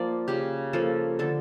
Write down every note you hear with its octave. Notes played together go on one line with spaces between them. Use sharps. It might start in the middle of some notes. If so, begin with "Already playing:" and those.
Already playing: F3 A#3 D5
C#3 G4
F3 A#3 A4
D3 A4